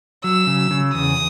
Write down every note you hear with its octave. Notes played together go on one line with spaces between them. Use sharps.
F#3 E6
C#3
C#3
E2 D#6